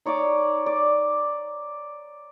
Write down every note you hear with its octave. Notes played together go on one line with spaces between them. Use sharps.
D#4 C#5 D5 D6
D5